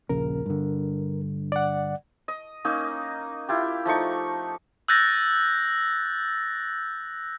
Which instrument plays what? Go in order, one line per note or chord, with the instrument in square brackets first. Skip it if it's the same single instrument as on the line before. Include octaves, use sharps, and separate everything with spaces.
[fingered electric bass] D#1 A#1 C#3 [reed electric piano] A#4
[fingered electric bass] G2 D3
[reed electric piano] D5 F#5
[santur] D#5
A#3 C#4 D#4 D#5
E4 F4 G4
F3 A3 D#4 C#6
[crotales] E6 F#6 G6 A6 A#6